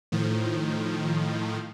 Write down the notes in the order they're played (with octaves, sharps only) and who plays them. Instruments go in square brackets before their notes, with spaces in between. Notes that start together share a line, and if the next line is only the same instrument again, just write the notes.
[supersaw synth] A2 D#3 F3